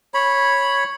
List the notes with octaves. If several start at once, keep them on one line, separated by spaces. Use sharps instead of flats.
C#5 B5